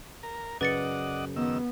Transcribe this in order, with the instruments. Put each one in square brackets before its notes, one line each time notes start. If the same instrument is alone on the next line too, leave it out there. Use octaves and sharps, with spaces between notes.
[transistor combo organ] A#4
[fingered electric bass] F#2 C#3 [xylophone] B4 A6 C#7 [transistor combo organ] D5 D#5 F#5
[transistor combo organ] D#3 E6 [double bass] B3